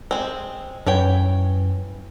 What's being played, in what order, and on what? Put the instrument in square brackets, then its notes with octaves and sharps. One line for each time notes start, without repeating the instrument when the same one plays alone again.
[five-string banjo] G#3 C4
[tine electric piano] F#2 [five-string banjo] E3 C#5 G5